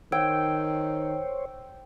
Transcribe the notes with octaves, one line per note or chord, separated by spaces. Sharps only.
D#3 C5 C#5 G5 E6 G#6 D7